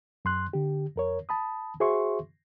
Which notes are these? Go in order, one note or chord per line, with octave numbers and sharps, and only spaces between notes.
F#2 C6 F#6
D3 G4
F2 A#4 C#5
A5 B5 D#6
F#4 G#4 C5 E5 C6 C#6